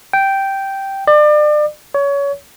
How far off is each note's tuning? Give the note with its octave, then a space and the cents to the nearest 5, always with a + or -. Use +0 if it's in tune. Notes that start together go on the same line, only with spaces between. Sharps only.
G5 -5
D5 +35
C#5 +25